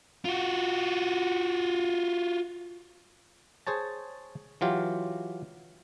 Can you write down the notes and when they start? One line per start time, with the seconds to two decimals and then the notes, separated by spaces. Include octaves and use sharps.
0.25 F4 F#4
3.67 G#4 C5 C#5 A5
4.61 E3 F#3 F4 G4